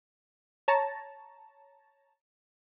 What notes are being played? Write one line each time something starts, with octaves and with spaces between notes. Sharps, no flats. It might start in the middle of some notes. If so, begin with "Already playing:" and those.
C#5 A5 A#5